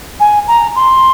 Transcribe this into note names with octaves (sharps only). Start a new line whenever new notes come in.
G#5
A#5
C6